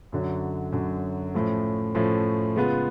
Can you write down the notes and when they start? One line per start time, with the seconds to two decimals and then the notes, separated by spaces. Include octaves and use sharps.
0.12 F#2 D3 F#3
0.72 F#2 D3 F#3
1.35 A2 F3 A3 C#4
1.95 A2 F3 A3 C#4
2.56 C#3 G#3 B3 F4 B4